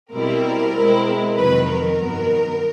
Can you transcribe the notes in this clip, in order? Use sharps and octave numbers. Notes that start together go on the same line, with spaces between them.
B2 G3 C4 E4 A#4
B2 G#3 C4 E4
F2 C3 D#3 F#3 B4
A#4
G2 D#3 F#3 B3